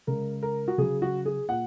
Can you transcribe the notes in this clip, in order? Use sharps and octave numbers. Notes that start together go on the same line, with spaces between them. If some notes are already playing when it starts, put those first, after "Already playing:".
C#3 G#3 A#4
A#4
F#4
C#3 F#3 G#4
F#4
G#4
A#2 F#5